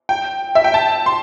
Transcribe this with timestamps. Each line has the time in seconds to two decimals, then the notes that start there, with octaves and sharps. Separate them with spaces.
0.09 G5
0.55 E5
0.64 G5
0.74 A5
1.06 C6